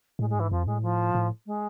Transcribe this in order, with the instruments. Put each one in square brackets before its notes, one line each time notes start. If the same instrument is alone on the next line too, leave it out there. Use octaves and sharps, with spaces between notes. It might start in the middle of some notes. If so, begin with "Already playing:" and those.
[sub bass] A2 [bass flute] G#3
[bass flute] G#3
[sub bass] G#2 [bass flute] E3
[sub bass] F2 [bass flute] F3
[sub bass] A2 [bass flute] G#3
[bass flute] F3
[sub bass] A2
[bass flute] G#3